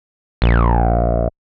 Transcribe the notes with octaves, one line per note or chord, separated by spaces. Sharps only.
A#1